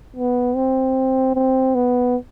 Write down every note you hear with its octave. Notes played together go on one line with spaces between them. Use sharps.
B3
C4
C4
B3